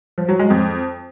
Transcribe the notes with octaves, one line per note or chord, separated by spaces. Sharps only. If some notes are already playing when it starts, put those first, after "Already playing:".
F3
F#3
G#3
F2